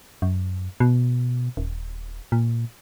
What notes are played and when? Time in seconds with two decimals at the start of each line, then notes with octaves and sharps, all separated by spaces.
0.22 F#2
0.80 B2
1.57 D#1
2.32 A#2